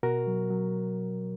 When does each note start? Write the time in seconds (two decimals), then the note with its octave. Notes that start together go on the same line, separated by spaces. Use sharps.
0.03 B2 F#4 A#4
0.27 F#3
0.51 F#3